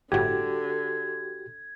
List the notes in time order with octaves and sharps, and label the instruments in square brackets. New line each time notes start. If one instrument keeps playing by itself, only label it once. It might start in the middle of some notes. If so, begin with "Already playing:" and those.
[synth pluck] G1 A2 [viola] D3 [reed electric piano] F#4 G4 [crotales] G#6